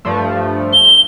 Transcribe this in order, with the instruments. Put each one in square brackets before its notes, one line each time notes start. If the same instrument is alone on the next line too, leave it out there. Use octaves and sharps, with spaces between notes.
[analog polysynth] G2 F3 A3
[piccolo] G7